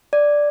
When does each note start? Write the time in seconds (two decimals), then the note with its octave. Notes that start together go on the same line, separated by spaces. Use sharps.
0.13 D5